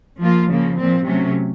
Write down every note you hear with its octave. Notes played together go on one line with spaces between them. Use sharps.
F3 A#3 F4
C#3 F3 A#3
A#2 F3 C4
C3 F#3 A3 C#4